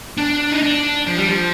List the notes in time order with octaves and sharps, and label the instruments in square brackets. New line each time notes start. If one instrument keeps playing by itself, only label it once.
[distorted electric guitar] D4
D#4
D4
F3
G3
F3